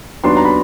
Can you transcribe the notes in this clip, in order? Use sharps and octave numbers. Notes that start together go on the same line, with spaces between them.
D#2 D#3 F#3 B3 D4 C6
A#5
B5